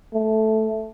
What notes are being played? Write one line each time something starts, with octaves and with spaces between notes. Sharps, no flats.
A3